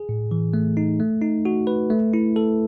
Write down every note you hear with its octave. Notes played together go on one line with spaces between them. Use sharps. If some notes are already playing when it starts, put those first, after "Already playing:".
Already playing: G#4
A2
E3
A3
D#4
A3
D#4
F#4
B4
A3
E4
A4